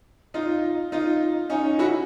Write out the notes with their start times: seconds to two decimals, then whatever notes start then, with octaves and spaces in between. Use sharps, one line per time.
0.34 D#4 F4
0.92 D#4 F4
1.50 C#4 D#4
1.79 E4 F#4